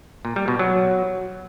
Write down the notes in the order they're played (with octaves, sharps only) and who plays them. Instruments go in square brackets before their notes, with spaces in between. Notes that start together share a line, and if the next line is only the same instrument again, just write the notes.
[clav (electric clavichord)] A#2
G3
B2
F#3